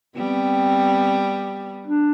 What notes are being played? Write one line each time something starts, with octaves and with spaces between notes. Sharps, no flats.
G3 B3 C4
D4